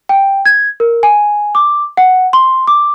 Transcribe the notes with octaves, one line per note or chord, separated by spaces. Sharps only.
G5
G#6
A#4
G#5
D6
F#5
C6
D6